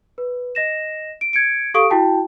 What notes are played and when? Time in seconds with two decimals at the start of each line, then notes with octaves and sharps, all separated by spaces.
0.18 B4
0.55 D#5 A#6 E7
1.21 D7
1.33 G#6 C#7 D7
1.74 G4 A4 F5 C#6 D#6 D7
1.90 E4 F#4 G5 A5